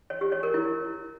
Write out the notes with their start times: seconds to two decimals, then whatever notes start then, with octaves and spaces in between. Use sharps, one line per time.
0.10 C#5
0.21 G4
0.32 C#5
0.43 A#4
0.54 E4